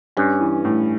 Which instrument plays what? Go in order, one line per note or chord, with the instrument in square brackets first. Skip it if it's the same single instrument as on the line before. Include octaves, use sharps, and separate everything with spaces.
[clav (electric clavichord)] G2 [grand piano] C#4
[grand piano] E3
A2